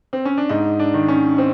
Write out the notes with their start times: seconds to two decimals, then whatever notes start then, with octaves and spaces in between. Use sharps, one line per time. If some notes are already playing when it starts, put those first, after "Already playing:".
0.13 C4
0.25 C#4
0.38 D4
0.49 G#2 D#4
0.79 D4
0.94 D#3
1.08 C#4
1.38 C4